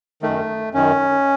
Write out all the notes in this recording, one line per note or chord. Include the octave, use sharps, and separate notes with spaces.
F#2 D#3 A3
F#2 D#3 C#4